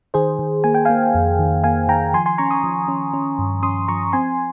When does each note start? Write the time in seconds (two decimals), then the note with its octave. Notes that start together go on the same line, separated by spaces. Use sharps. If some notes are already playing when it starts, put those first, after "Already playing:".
0.14 D#3 G#4 C5
0.39 D#3
0.64 A#3 G#5
0.74 G5
0.85 A#3 F5 G#5
1.15 F2
1.39 D#3
1.63 A#3 F5 G#5
1.88 D#3 G5 A#5
2.14 F3 G#5 C6
2.26 G#5 C6
2.38 C#4 A#5 C#6
2.51 C6 D#6
2.64 F3
2.88 C#4
3.14 C#4
3.39 G2
3.63 C#4 C6 D#6
3.88 F3 A#5 C#6
4.13 C4 G#5 C6